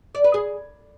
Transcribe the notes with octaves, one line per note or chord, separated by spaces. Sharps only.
D5
B4
G#4